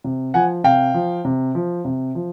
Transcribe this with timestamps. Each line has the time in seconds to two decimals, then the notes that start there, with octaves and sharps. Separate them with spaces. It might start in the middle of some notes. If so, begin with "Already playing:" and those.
0.04 C3
0.34 F3 F#5 G#5
0.64 C3 F5 G5
0.94 F3
1.25 C3
1.55 F3
1.85 C3
2.15 F3